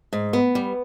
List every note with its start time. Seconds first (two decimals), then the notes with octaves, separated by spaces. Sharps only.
0.13 G#2
0.33 B3
0.55 G3